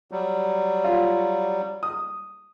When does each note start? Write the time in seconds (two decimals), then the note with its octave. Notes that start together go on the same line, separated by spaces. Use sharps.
0.11 F#3 G3
0.84 F4
1.83 D#6